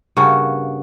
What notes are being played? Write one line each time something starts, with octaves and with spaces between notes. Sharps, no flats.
G2 C#3 A#3 F#4